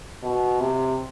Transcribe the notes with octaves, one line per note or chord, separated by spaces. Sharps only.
B2
C3